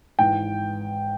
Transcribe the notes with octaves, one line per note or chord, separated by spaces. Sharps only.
G#1 G#2 E3 G5